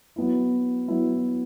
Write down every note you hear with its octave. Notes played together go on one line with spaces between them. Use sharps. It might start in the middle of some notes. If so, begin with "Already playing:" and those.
F#3 B3 E4
F#3 B3 E4